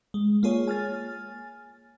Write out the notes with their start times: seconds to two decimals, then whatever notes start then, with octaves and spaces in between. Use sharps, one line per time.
0.14 G#3
0.43 A#3 F4 G#4 C#5
0.68 G#5 F6 A6